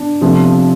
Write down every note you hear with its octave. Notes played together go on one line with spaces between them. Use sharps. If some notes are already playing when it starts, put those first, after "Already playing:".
Already playing: D4
C3 F3 A3